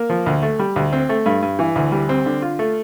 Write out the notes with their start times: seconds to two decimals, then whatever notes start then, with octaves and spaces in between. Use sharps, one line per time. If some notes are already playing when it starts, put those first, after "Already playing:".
Already playing: A#3
0.10 F3
0.26 D2
0.43 A3
0.59 G3
0.76 D2
0.93 C4
1.09 A3
1.26 G2
1.42 G2
1.59 E3
1.76 D2
1.92 G3
2.09 C4
2.26 D3
2.42 F4
2.59 A3